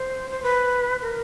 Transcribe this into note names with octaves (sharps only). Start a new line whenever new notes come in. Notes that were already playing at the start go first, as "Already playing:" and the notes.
Already playing: C5
C5
B4
A#4